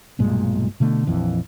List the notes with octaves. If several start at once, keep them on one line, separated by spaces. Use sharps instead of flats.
B1 G2 A#2 G#3
B2 D3 A3
A#1 F2 E3